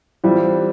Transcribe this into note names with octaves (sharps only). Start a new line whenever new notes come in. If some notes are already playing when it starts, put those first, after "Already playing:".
E3 G3 C4 F4